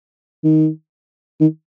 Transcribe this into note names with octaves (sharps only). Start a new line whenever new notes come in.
D#3
D#3